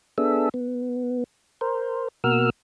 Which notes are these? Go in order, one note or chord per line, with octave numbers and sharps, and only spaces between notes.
B3 D4 G#4 A4 E5
B3
A#4 C5
B2 A#3 F#4 A#4 E6 F6